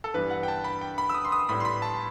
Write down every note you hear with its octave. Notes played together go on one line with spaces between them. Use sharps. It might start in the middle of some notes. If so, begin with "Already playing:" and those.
A4
G2 E3 G3 B3 B4
F#5
G5
A5
B5
G5
B5
E6
D#6
C6
D#6
A2 G3 B3 B5
C6
B5
A5